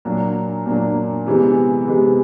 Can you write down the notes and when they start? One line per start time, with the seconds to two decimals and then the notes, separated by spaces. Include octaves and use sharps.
0.05 A#2 F#3 A#3 D4
0.66 A#2 F#3 A#3 D4
1.26 C3 E3 G#3 B3
1.87 C3 E3 G#3 B3